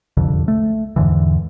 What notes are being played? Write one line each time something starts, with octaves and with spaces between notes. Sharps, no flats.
E1 C2 F2 D3
A3
E2 G#2 D3 E3